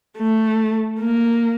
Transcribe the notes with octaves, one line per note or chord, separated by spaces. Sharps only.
A3
A#3